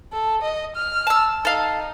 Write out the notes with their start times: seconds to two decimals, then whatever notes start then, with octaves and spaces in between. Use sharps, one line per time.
0.13 A4
0.42 D#5
0.76 F6
1.07 A5 E6
1.45 D#4 A4 F5